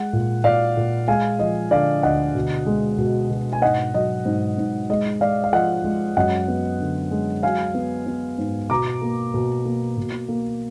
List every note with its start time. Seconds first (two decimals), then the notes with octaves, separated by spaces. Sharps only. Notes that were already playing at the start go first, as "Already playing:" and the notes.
Already playing: G#3 F#5
0.13 A#2
0.44 A#2 D5 F5
0.77 A#2
1.08 G#3 F5 G#5
1.39 F3 D#5
1.71 D3 D5 F5
2.03 D2 D#5 F#5
2.35 B2
2.66 G#3
2.98 B2
3.31 B2
3.53 G#5
3.62 G#2 D#5 F#5
3.94 F#3 D#5
4.25 G#2
4.58 G#2
4.89 G#3 D#5
5.21 G#3 D5 F5
5.44 F5
5.53 F3 D#5 F#5
5.84 G#3
6.17 F#2 D#5 F#5
6.48 B3
6.80 D3
7.11 G#3
7.43 F#3 F5 G#5
7.74 B3
8.07 B3
8.38 G#2
8.70 B2 A#5 D6
9.01 A#3
9.34 B2
9.65 A#3
9.98 B2
10.29 A#3